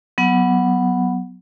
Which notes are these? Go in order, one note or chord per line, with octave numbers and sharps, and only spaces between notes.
F#3 B3 F#5